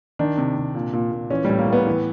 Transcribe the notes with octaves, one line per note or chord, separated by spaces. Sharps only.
D#3 D4
C3
C3
A#2
A#2
A#2
E3 C#4
A2 G3
A#3
A2 B3
E3